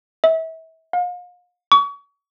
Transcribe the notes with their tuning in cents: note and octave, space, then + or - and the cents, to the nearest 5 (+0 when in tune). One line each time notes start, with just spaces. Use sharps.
E5 -30
F5 +40
C#6 +35